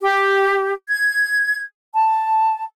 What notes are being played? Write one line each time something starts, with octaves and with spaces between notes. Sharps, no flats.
G4
G#6
A5